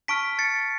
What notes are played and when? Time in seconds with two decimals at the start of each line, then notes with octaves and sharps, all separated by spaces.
0.08 A5 C#6 F6 B6 D7
0.39 A6 C#7